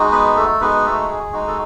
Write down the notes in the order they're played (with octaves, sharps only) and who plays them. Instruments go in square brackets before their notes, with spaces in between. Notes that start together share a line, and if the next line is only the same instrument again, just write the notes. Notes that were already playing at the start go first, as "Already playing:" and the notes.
Already playing: [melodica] G#3 D#4 F#4
B3 B4
A3 A4
G#3 B3 D#4 F#4 B4
A3 A4
G#4
G#3 D#4 F#4
A4